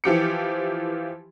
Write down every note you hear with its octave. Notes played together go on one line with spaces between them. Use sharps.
E3 F3 G4 C#7